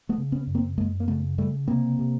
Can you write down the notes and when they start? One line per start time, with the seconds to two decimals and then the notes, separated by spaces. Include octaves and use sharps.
0.09 A3 B3
0.18 C#3
0.32 B3 C#4
0.47 F#2
0.55 A#3 C4
0.78 F#2 G#3 A#3
1.00 A#3
1.08 C#3 A3 B3
1.38 C#3 G3 A3
1.68 C3 A#3 C4
1.99 C3